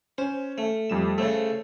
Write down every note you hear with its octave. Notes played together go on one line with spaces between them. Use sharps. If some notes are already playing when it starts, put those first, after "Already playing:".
C#4 C5
A3
F2 G3 E7
C#3 A3 A4 C5 C#5